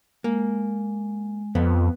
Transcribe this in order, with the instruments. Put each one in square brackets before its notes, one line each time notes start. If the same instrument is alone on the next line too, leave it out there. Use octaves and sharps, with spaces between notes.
[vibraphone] G#3 [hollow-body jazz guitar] A#3
[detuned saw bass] F2 [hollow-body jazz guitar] B3